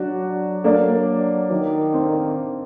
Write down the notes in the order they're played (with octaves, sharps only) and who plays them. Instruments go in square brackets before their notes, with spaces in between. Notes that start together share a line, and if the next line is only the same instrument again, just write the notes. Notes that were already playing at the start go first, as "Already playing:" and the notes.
Already playing: [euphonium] F#3 [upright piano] D4 F#4
[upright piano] A#3 D4
[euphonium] D#3
[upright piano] C4